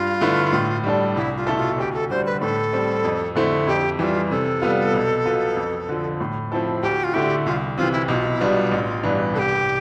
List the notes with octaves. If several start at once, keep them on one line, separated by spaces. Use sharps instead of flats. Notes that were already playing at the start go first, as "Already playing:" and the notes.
Already playing: G2 F4
D3 A3 E4 B4
A2
G3 D4 A4
C2 E4
F4
B2 A3 E4 A4
F4
D2 G4
A4
D3 G3 C5
B4
A2 A4
G3 C4
F2
D3 A3 C4 E4
F2 G4
E3 G3 F4 G4
C3 A4
G3 B3 F4
B1
B2 B3 F4
F2
D3 F3
A2
F3 C4 E4 A4
D2 G4
F4
D3 A3 E4 G4
C2 F4
C3 E3 F4
E4
B1 F4 G4
E4
B2 G3 B3 D4 F4
A1
G2 E3 B3 D4
C2 G4 A4